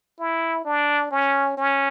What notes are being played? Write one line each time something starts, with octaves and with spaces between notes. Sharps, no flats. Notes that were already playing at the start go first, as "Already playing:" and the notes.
E4
D4
C#4
C#4